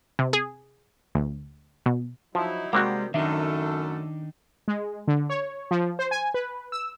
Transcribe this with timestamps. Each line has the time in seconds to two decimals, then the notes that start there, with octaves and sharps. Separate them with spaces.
0.19 C3
0.33 G#4
1.15 D2
1.86 B2
2.35 F3 F#3 D#4 E4
2.73 C3 G3 G#3 A#3 C4 F#4
3.14 F#2 D#3 A3 D4 D#4 A4 E5
4.68 G#3
5.08 D3
5.30 C#5
5.71 F3
5.99 C5
6.11 G#5
6.34 B4
6.72 E6